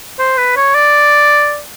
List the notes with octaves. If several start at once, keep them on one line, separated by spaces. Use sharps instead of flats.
C5
B4
C#5
D5